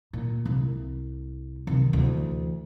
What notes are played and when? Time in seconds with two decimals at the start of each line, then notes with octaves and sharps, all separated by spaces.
0.13 A#2
0.46 C2
1.67 C3 D#3
1.93 D2 E3